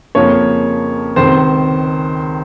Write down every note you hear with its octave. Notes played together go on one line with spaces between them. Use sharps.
F2 C#3 F3 A#3 C#4 C#5
C#2 C3 D#3 C5